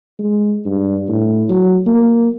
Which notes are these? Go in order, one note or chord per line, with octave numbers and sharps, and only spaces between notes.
G#3
G2
A2
F#3
A#3